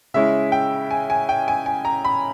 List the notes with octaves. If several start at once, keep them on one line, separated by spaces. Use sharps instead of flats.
C#3 G#3 C#4 E4 E5
G5
G#5
G#5
G5
G#5
G#5
A#5
B5